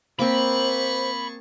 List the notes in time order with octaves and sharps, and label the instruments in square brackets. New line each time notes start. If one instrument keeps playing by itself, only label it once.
[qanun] A#3 C4 [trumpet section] G#4 A5 C#6 [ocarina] C5 [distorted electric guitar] B5